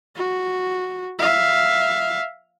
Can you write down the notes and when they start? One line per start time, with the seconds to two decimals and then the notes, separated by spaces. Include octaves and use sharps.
0.16 F#4
1.19 E5 F5